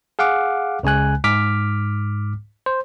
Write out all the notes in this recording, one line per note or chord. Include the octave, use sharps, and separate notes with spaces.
G#4 F5 F#5 D6
C#2 C#3 G#3 G#5 F#6
G#2 D6 F6 B6
C5